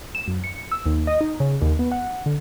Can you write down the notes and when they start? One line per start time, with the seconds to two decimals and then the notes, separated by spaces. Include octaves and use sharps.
0.15 E7
0.28 F#2
0.44 C#7
0.71 E6
0.86 D#2
1.07 D#5
1.21 D#4
1.40 C#3
1.62 D#2
1.79 B3
1.92 F#5
2.26 D3